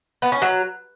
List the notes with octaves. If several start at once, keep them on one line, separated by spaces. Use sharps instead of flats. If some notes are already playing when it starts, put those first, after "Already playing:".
B3
C#4
F#3